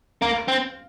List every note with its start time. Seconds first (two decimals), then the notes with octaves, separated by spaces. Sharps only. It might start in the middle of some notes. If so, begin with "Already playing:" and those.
0.21 A#3 F5
0.48 C4